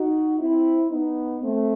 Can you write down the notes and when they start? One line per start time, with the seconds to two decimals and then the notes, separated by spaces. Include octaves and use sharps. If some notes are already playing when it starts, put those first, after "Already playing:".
Already playing: D#4 F#4
0.39 C4 E4
0.90 B3 D#4
1.41 A3 C4